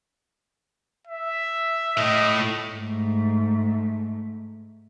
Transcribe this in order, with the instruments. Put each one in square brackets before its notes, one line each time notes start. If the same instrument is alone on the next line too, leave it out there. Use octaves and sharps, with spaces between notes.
[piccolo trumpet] E5
[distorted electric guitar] A2 [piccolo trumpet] D#5
[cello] G#2 A3